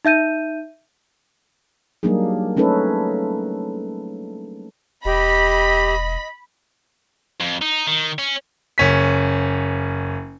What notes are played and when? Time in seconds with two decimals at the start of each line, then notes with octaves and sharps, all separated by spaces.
0.05 D#4 E5 G6 D#7
2.03 F#3 G3 A#3 D4 D#4 G#4
2.57 A3 C#4 D#4 A4 B4
5.05 E1 G4 D#5 B5
7.40 F2
7.62 D#4
7.87 D#3
8.19 C#4
8.78 F#1 C#4 B6